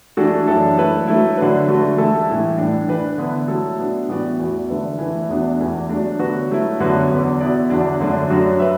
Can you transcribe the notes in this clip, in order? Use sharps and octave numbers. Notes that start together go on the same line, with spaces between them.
E3 A3 D4 F#4 A4
F#2 E3 D4 A4 E5
A3 E4 B4 E5
F#3 A3 E4
D3 F#3 D4 B4
D3 A3 F#4
E3 A3 E4 A4 E5
A2 E3 A3 E4
A2 E3 D4
E3 D4 B4
D3 B3 E4
F#3 A3 E4 A4
B2 B3 D4
A2 E3 B3 F#4 D5
E2 E3 B3 F#4
D3 A3 D4 B4 E5
E3 A3 E4 B4 E5
E2 B2 B3 D4
E2 E3 A3
F#3 A3 D4
D3 F#3 B3 F#4 B4
F#3 A3 E4
F#2 D3 B3 F#4 B4
E2 D3 B3
B2 B3 E4 D5
E2 D3 F#3 D4
F#2 D3 A3 D4
F#2 F#3 D4 F#4
B4 E5